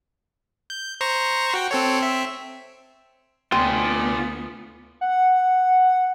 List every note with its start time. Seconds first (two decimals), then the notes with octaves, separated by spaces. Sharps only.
0.70 G6
1.01 C5 A#5 C#6
1.54 F#4 G5
1.71 C4 A4 C#5
2.01 C4 E5
3.52 D2 B3 C4 F4 G#5
5.01 F#5